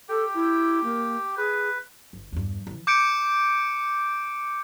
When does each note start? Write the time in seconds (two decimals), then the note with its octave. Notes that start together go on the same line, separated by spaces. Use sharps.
0.09 G4 A4 G5
0.34 E4
0.84 A#3
1.37 G#4 B4
2.13 G1
2.32 E2 G2
2.67 C#3 E3
2.87 D6 G6 C#7 D7